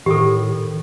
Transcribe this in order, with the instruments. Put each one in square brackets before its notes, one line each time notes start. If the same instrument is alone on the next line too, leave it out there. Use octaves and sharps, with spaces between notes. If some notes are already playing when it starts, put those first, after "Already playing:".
[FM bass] A2 [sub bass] D#3 [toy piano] G4 A4